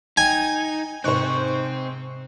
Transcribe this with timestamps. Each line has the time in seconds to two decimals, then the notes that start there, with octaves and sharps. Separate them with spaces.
0.17 D#4 G5 G#5
1.04 G#2 C3 C4 C5 C#6 F#6